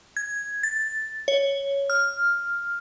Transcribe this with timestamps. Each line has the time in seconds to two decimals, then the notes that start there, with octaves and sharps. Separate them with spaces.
0.17 G#6
0.63 A6
1.28 C#5
1.90 F6